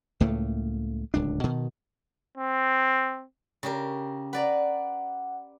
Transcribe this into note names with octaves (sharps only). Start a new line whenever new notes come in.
C#2 A2 A3 A#3
D1 C#2 D4
B2 D#3
C4
C#3 G4 A#4
B4 D5 F#5 A#5